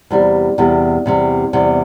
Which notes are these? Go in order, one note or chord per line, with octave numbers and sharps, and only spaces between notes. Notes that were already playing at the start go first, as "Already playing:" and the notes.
E2 C3 G3
E2 C3 G3
E2 C3 G3
E2 C3 G3